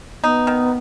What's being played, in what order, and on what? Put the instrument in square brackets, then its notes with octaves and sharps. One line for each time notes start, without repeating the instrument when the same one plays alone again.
[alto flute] B3 [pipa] D#4
[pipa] D#3